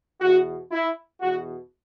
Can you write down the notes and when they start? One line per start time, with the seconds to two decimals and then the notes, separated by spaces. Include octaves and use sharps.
0.21 E2 B2 F#4
0.72 E4
1.21 E2 B2 F#4